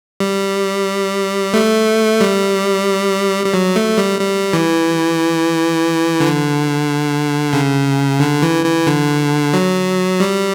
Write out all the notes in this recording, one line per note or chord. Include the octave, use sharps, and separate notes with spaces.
G3
A3
G3
G3
F#3
A3
G3
G3
E3
D3
C#3
D3
E3
E3
D3
F#3
G3